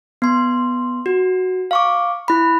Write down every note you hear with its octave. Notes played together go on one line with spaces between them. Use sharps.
B3 C6
F#4
F5 C#6 D6
E4 B5